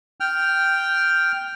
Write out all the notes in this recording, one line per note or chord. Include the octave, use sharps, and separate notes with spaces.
G5 F6